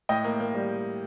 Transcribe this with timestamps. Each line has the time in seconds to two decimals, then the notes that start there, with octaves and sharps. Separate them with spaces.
0.09 A2 D#5 G5
0.24 A#3
0.40 A#3
0.55 G3